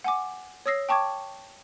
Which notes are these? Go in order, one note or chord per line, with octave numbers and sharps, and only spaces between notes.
F#5 G#5 D6
C#5 D#6 E6 A#6 C7
G5 A5 C#6 D6 G#6